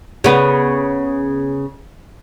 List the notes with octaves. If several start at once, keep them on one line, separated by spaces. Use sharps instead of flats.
C#3 B3